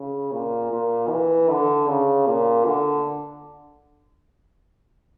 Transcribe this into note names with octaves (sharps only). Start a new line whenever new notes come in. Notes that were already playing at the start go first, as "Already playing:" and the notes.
Already playing: C#3
A#2
A#2
E3
D3
C#3
A#2
D3